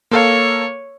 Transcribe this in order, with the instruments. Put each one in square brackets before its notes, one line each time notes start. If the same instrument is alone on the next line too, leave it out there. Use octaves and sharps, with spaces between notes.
[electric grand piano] A#3 A4 F5 [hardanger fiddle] C#5